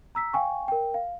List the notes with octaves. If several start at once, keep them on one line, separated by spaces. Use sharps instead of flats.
A#5 E6 B6
F5 G5 G#5 C#6
A#4 G5
F5